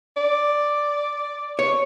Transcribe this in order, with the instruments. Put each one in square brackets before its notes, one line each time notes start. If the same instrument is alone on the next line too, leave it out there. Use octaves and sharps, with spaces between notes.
[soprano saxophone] D5
[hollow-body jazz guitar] C#5